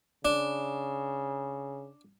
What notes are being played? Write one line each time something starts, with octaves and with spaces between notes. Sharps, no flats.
C#3 D4